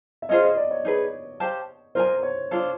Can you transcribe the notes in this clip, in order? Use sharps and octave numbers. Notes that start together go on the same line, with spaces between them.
E5
C#4 F4 G#4 C5 D#5
D#5
D5
C#5
D#4 G#4 B4
G4 C5 F5 A5
F4 A#4 C5 D#5 G#5
C#5
D4 F4 A4 C5